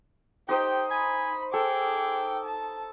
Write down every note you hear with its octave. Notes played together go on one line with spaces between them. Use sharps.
D#4 G4 C5 D#5 G5
G#5 B5
G#4 A4 G5 D6
A5